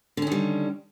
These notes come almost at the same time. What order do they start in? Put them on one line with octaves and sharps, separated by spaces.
D3 C#4 D#3 G3